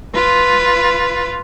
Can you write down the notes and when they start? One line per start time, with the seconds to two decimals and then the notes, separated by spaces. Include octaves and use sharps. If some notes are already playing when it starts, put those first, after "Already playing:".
0.15 F4 B4